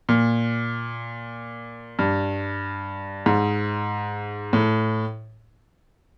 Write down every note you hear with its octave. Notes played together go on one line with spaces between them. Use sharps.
A#2
G2
G#2
A2